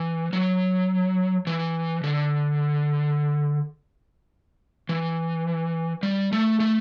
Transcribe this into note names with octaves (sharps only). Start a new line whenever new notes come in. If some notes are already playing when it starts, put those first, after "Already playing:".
Already playing: E3
F#3
E3
D3
E3
G3
A3
A3